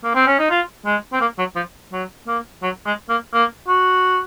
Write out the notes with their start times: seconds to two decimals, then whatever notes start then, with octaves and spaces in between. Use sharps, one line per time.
0.04 A#3
0.15 C4
0.27 C#4
0.39 D#4
0.50 F4
0.85 G#3
1.13 C4
1.21 A#3
1.39 F#3
1.56 F3
1.92 F#3
2.28 A#3
2.62 F#3
2.86 G#3
3.09 A#3
3.34 A#3
3.68 F#4